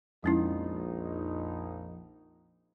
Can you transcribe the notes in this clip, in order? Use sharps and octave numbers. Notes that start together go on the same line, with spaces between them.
A#1 F2 G#3 C#4 D#4 E4